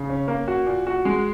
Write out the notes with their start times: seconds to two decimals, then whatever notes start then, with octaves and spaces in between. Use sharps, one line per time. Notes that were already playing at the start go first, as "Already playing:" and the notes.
Already playing: C#3
0.10 C#4
0.28 A#3
0.48 F#4
0.66 A#2
0.87 F#4
1.05 G#3